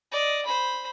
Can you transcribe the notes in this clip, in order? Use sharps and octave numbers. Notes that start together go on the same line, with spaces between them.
D5 D#5
C5 B5